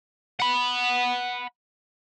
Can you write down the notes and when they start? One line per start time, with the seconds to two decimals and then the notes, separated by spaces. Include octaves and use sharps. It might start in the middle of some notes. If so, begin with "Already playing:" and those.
0.40 F#5 B5